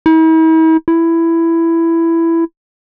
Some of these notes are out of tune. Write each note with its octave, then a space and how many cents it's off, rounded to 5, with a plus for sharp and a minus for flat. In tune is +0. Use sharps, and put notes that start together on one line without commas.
E4 -45
E4 +10